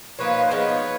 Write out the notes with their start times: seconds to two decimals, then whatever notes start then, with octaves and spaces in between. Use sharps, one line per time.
0.19 F3 A#3 D#4 B4 C#5
0.47 C5
0.51 F3 G#3 B3 D#4 B4 C#5